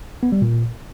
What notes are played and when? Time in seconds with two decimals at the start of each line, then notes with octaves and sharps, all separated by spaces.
0.23 B3
0.32 G3
0.42 A#2